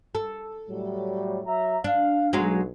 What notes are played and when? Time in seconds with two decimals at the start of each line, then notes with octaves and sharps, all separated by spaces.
0.15 A4
0.69 A2 F#3 G3
1.46 F#3 E5 A#5
1.84 D4 F5
2.33 B1 F#3 G#3 F5